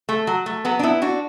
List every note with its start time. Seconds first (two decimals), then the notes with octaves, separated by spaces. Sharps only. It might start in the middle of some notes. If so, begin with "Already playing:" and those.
0.09 A3
0.27 F#3
0.46 A3
0.65 F#3 B3
0.79 D4
0.83 B3 E4
1.02 D4 F#4